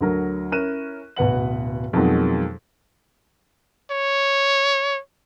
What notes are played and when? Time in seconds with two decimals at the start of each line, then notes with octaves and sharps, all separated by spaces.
0.01 D2 D3 F#3 A#4
0.52 C#4 E4 A#4 F#6 D#7 E7
1.16 D1 B2 B4 F#5 F#7
1.93 F2 B2 D#3 F#3 G#3
3.91 C#5